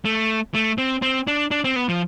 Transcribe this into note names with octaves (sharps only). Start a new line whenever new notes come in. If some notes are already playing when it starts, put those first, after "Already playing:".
A3
A3
C4
C4
D4
D4
C4
B3
F3